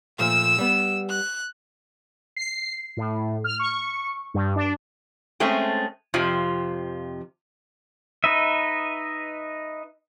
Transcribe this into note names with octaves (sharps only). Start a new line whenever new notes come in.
A#2 F3 A3 E6 E7
G3 B3
F#6
C7
A2
F6
C#6
G2
D4
G#3 A3 C4 C#4
F2 C3 F3
D#4 B4 D#5 E5